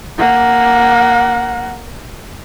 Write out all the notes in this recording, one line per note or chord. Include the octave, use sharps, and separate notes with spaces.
A#3 F#5